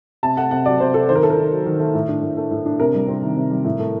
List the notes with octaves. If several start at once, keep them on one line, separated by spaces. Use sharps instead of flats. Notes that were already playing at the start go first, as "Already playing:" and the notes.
C3 A5
A3 F#5
C3 F#5
F#3 D5
C3 C5
A3 A4
D#3 C5
A#4
A3 A4
A#4
D#4
F#3
D#3
A3
A2
D4
A2
A3
A2
D4
C3 A#4
G3
C4
D#3
C3
G3
A2
A3